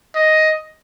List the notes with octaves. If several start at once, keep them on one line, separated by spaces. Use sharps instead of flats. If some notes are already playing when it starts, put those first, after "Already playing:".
D#5